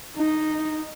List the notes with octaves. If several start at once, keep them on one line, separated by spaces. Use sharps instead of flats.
D#4